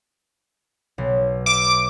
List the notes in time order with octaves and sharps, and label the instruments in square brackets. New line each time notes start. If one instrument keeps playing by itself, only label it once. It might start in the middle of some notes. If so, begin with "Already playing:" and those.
[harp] B1
[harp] E5 [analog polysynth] D6